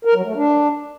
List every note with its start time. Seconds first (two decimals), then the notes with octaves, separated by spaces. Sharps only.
0.05 A#4
0.15 F#3
0.26 A3
0.36 D4